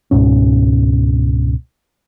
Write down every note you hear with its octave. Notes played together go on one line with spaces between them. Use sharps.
C#2 G#2 B2 C#4